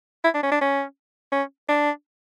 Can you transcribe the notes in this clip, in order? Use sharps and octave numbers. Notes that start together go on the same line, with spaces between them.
E4
D4
C#4
D4
C#4
C#4
D4